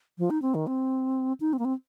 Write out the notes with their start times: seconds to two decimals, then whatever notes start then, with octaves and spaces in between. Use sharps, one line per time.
0.18 F3
0.30 D#4
0.42 C4
0.55 D#3
0.67 C4
1.40 D#4
1.53 C4
1.59 A#3
1.65 C4